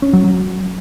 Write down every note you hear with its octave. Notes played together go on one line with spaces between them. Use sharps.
C#4
F#3
F#3